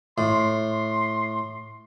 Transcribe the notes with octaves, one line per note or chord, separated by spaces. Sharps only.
A2 C6